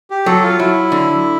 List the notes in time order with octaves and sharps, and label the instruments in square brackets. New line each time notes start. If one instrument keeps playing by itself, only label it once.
[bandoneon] G4
[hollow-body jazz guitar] F#3 [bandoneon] A4
[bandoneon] F4
[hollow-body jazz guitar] F#3 [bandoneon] E4
[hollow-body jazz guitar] D3